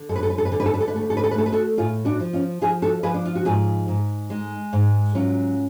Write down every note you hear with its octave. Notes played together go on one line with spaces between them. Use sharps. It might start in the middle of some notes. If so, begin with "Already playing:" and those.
Already playing: D3
F#2 A4
B4
A4
B4
A4
B4
D3 A4
B4
A4
B4
A4
B4
A3 A4
B4
A4
B4
A4
B4
A3 A4
B4
F#4 A4
A2 F4 G#4
D4 F#4
F3
C#4 F4
F3 F4 G#4
F#4 A4
F3 G#4 B4
D4
F4
F#4
G#2 F4 G#4
G#2
G#3
G#2
F#3 C#4 F4